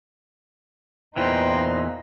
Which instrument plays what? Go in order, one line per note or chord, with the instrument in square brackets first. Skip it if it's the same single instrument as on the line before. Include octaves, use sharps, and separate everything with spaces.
[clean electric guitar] E2 A#2 E3 [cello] D#4 [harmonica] B4 G5 C6 [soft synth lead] C5